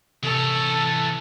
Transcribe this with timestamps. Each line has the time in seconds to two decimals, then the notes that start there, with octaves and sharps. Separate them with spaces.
0.23 C3 E3 A4 C#5 A5